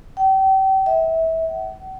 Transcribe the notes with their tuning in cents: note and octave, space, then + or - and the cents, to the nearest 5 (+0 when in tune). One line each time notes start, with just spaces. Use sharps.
G5 -35
E5 -25
F#5 +40